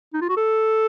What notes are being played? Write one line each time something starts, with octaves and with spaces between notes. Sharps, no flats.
D#4
F4
F#4
A4